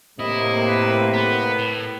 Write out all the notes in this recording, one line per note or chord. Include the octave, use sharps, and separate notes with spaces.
A2 C3 A#3 E4 D#5
B4
B3 B4
A2